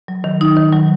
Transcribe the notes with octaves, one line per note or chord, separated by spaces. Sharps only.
F#3
D#3
D#4
D#3
F#3